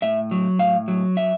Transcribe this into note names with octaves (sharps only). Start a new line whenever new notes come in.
A2 E5
F#3
A2 F5
F#3
E5